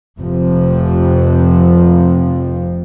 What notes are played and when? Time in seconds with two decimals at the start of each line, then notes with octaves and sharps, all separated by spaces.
0.19 F1 F2 C3 F3